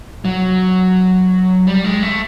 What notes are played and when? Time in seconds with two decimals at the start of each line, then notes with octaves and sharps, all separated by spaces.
0.25 F#3
1.67 G3
1.84 G#3
2.03 A3